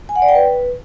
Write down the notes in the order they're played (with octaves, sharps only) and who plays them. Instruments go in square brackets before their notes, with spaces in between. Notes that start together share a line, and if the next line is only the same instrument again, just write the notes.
[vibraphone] G#5
F#5
D5
G5
B4